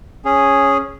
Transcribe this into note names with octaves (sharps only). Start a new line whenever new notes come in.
C#4 G#4